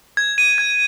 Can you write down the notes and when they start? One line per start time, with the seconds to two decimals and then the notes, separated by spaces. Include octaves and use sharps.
0.17 G#6
0.38 D#7
0.58 G#6